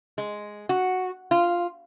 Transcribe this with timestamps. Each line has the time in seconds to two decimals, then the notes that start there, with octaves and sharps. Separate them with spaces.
0.18 G#3
0.69 F#4
1.31 F4